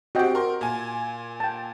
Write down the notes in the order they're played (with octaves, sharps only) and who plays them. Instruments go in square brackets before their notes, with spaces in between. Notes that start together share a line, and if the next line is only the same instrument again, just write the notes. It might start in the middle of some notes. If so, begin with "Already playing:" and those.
[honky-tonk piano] C4 G4 [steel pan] F#4 D#5 G5
[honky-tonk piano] A#4 C6
A#2 G#5
[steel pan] G5 A5